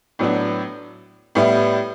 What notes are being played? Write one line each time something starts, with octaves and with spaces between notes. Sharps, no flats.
A2 F#3 B3 D4
A2 G3 B3 E4